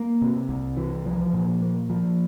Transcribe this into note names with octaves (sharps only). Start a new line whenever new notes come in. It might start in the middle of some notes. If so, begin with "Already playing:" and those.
Already playing: A#3
C3
C2
E3
F3
A#2
A#3
F3